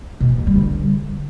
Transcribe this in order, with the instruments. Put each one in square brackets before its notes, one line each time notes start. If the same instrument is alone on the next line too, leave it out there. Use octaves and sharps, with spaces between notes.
[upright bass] B2
E3
B3
G3
D3